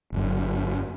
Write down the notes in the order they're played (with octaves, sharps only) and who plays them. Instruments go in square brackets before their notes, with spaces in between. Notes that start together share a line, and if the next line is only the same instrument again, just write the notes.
[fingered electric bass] G1 F#2